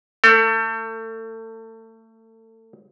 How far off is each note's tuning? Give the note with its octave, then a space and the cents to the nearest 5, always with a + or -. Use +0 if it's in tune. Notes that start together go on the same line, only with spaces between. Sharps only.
A3 +30 A4 +35